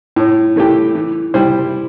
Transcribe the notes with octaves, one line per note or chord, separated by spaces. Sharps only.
A2
E3 A3 E4 G4
E3
G3 E4 C5